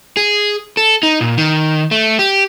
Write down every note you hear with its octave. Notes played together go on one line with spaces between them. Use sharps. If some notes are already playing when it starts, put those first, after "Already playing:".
G#4
A4
D#4
A#2
D#3
A3
G4